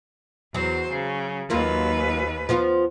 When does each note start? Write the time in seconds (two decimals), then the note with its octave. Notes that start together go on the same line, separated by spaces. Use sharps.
0.54 E2 F#3 C5
0.92 C#3
1.50 D#2 F#3 A#3 F4 B4
2.49 F3 B3 F4